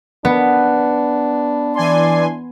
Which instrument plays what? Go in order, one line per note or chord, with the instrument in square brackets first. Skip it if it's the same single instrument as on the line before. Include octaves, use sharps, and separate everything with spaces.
[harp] B3 [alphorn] D4
[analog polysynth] E3 G#5 C6 [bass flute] D5